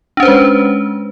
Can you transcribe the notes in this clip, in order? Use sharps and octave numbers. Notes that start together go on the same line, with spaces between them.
G#3 C#4 D4 B4 C5